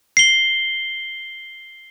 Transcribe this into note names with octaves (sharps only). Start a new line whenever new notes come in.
C7 G7